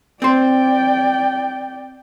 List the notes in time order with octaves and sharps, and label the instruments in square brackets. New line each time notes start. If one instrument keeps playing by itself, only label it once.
[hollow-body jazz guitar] C4 C5 [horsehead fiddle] D5 G5